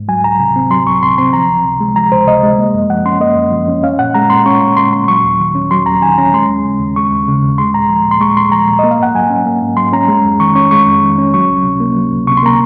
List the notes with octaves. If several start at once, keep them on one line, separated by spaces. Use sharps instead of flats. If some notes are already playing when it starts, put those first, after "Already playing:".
Already playing: G#2
F#3 G#5
C2 A#5
C3
C4
F#3 C6
C2 C#6
C3 C6
C4 C6
F3 A#5
C#2
C3
G#3
F3 A#5
C#2 C5
C3 D#5
G#3
A#3
F#2
F3 F#5
C#4 C6
A#3 D#5
F#2
F3
C#4
C#4 F5
A#2 F#5
G#3 A#5
A#2 C6
C#4 C#6
A#2
G#3 C6
A#2 C6
F#3 C#6
D#2
D#3
C#4
F#3 C6
D#2 A#5
D#3 G#5
C#4 A#5
G#3 C6
D#2
C#3
D#2
G#3 C#6
D#2
C#3
D#2
G#3 C6
A#2 A#5
F3
A#2
C6
G#3 C#6
A#2 C6
F3 A#5
A#2
A#3 D#5
F5
G#2 F#5
F#3 G#5
C#4
A#3
G#2
F#3 C6
C#4 A#5
G#3
F2
D#3 C#6
C#4 C#6
G#3 C#6
F2
D#3
C#4
F#3 C#6
C#2
C3
A#3
F#3
C#2
C3 C#6
C6
A#3 A#5